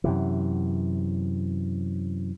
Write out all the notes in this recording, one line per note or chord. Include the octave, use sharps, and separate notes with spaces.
F#2 C3 E3